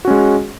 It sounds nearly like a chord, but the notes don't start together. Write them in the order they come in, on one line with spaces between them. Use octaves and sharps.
F#4 C#4 G#3